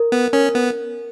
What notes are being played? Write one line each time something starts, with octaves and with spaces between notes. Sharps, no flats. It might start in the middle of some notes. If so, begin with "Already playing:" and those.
Already playing: A#4
B3
C#4 A#4
B3